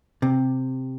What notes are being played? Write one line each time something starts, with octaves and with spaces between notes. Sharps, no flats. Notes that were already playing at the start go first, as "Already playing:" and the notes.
C3